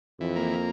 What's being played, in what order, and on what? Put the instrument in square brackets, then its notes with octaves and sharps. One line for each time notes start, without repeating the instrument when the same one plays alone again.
[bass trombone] F2 [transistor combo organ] E3
[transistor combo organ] A#3